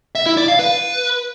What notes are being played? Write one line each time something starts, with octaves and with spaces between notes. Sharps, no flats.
E5
E4
D5
F5
B4